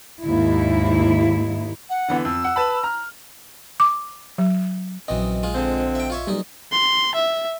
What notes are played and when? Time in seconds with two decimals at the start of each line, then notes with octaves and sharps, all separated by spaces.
0.22 D#2 G#2 D#4 E4
1.89 F#5
2.08 D3 E3 B3
2.25 F2 E6
2.44 F#5
2.56 B4 A5 B5
2.83 A#5 F6
3.80 D6
4.38 F#3
5.08 A#1 F#2 E3 C4 D#5
5.43 G#3 F4
5.55 D3 F3 C4
5.95 E5 G5
6.10 F4 C#5 E5
6.27 B1 A#2 G3 D#4
6.72 C6
7.15 E5